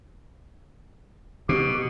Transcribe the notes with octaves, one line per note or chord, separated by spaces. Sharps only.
B2 G4